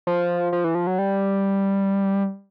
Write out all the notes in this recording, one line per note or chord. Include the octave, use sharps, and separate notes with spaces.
F3
F3
E3
F3
F#3
G3